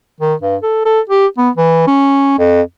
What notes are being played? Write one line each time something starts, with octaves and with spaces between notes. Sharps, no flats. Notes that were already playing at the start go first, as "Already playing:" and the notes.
D#3
G2
A4
A4
G4
B3
E3
C#4
F2